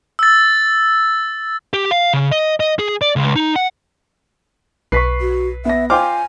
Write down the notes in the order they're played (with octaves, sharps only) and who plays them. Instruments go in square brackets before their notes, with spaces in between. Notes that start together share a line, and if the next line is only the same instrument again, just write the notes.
[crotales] E6 A6
[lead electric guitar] G4
F5
C#3
D#5
D#5
G#4
D5
C#2
D#4
F#5
[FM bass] B1 [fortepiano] B4 [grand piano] C#6 B6 C7
[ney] F#4
[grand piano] B3 A#6 [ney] E5
[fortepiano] F4 C5 D6 [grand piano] G5 C6 F6 [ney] G#5